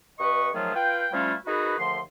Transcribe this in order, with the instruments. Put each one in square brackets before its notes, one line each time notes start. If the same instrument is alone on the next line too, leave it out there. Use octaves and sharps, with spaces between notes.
[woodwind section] G2 B4 D#5 C#6
D#3 F3 F#3 A3 F4 G#4
F4 B4 F5 G5
F3 G3 A3 C#4 E4 F4
D#4 F#4 G#4 A#4 B4
D#2 D3 F3 A3 C6